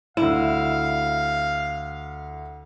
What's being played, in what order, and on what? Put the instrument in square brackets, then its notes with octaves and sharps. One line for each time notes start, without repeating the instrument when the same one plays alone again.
[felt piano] D2 E6 E7 [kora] E4 [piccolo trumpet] F5